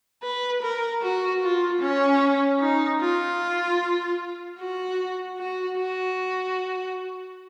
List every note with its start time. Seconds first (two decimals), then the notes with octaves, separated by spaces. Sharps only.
0.23 B4
0.62 A#4
1.02 F#4
1.42 F4
1.81 C#4
2.60 D#4
3.00 F4
4.59 F#4
5.38 F#4
5.78 F#4